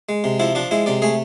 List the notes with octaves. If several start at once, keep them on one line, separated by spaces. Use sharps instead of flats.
G#3
C3
F3 E4
F3 D4
G#3 E4
C3 D5
A3 G#4